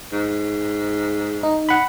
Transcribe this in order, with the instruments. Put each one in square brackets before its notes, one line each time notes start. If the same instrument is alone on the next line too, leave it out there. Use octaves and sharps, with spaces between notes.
[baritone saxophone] G#2
[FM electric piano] D#4
[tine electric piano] F#5 B5